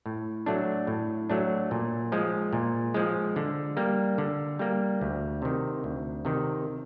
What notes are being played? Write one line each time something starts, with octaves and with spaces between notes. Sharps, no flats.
A2
F#3 A3 D4
A2
F#3 A3 D4
A#2
F3 G#3
A#2
F3 G#3
D3
G3 A#3
D3
G3 A#3
D2
C3 D#3
D2
C3 D#3